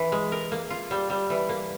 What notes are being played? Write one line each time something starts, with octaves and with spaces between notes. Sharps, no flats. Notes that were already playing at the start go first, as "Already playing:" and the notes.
Already playing: E3
G#3
A#4
A#3
F4
G3
G3
E3
A#3